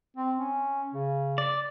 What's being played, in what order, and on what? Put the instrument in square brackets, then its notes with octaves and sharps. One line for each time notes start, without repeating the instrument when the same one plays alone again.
[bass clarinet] C4
C#4
C#3
[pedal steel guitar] D5